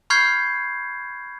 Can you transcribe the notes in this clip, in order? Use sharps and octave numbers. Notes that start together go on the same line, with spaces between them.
B5 C#6 F6 G6 G#6 C7